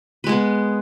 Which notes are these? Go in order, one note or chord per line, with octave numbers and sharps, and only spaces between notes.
G#3 B3 G#4 B4